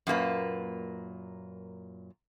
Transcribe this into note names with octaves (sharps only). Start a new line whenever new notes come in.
F#2 A#2 A#3 B4